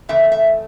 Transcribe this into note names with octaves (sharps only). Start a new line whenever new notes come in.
C#3 E3 A3 C4 E5
E5